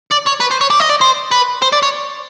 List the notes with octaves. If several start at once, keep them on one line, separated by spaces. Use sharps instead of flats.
D5
C#5
B4
C5
C#5
D5
D#5
D5
C5
B4
C5
D5
C#5